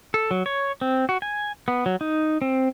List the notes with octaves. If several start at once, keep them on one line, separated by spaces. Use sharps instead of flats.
A4
F#3
C#5
C4
F#4
G#5
B3
F#3
D#4
C4